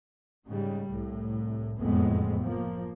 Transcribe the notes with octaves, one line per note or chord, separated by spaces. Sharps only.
G#2 C#3 G3
C2 A2
F#1 F2 A2 G#3 B3 C4
F3 A#3